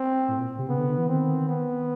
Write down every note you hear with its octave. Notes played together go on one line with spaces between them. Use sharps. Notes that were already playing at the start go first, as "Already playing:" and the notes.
Already playing: C4
A2
A#2
C3
C#3 B3
D3
D3
E3
D#3 C4
B3